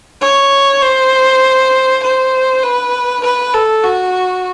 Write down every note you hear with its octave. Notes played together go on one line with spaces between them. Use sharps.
C#5
C5
C5
B4
B4
A4
F#4